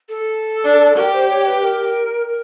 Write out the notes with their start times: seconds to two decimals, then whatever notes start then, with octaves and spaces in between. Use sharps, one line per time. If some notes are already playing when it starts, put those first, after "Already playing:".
0.09 A4
0.64 D4
0.96 G4 A#4
1.13 C5
1.29 C#5
1.46 B4
1.62 A#4
2.28 A#4